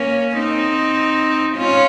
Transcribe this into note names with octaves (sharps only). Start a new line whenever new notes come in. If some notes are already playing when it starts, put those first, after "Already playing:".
Already playing: A#3 C#4
C4 D#4
C#4 F4